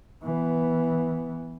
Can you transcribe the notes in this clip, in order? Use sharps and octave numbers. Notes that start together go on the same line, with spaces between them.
E3 B3